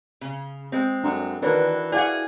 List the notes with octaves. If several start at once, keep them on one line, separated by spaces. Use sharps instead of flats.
C#3
G#3 C4
F#2 D4
D#3 E3 D4 F#4 A#4 B4 C#5
E4 G#4 D5 F5 F#5